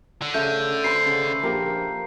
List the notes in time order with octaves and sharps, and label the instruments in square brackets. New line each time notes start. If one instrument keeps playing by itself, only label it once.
[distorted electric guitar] D3
[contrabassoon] C#3 [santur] A3 [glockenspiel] G6
[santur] B4 C5 B5 [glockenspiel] C7
[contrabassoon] C#3
[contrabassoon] A#1 [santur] A#3 G4 A#4